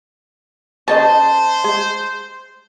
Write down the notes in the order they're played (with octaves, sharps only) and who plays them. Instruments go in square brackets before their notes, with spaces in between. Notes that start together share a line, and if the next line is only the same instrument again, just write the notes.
[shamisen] C#3 C#4 D#5 [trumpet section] C5 [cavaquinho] A5
[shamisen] G#3